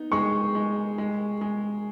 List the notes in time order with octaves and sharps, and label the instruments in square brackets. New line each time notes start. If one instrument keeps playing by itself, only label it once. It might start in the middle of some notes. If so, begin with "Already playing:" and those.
Already playing: [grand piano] B3 D#4
[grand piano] G#3 [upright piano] C#6
[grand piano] G#3
G#3
G#3